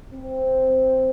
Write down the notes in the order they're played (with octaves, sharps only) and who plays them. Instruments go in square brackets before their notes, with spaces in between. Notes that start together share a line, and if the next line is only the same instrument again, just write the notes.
[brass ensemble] C4